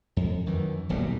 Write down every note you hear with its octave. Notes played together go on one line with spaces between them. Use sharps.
F2
F#2 D#3 E3
D#1 B1 B2 G3